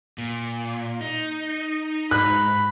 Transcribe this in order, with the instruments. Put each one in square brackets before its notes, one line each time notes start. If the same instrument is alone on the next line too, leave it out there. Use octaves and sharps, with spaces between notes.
[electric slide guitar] A#2
D#4
[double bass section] G#2 [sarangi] B5 [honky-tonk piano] F#6